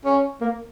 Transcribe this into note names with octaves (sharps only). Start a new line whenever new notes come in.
C#4
A#3